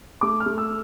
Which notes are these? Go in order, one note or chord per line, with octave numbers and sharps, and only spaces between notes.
A3 D6
F6
A3
E6